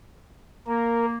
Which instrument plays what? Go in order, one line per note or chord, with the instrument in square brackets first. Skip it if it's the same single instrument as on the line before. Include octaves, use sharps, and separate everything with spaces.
[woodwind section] A#3 [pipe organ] A#4